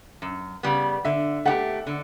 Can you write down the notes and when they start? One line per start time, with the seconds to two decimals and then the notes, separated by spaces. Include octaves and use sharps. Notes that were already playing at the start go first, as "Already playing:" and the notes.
0.22 F#2
0.63 C#3 G3 B3
1.05 D3 E5
1.45 A3 D4 G4 F#5
1.87 D3